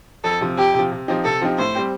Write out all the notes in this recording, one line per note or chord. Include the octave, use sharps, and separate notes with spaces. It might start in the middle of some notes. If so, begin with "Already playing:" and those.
F2 A4
C3 F3
F2 G4
C3
F3
C3
F3 C4 D#4 G4
C3 A4
F3 C4 D#4 G4
A2 C5
G3 C4 G4